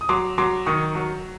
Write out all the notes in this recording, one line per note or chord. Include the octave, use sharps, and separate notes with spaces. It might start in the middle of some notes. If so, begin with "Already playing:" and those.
D#6
F#3 C6 D6
F#3 C6 D6
D#3 C#6 D#6
F#3